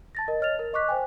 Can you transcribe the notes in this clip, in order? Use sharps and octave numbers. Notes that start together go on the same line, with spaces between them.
A5 A6 A#6
A#4 D#5
C#5 D#5 F6 A6 F7
A#4
D#5 C#6 D6 F#6 B6
C5 G5 G#5